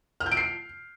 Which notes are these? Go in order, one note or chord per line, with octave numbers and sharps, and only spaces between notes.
F6
G6
D7
C7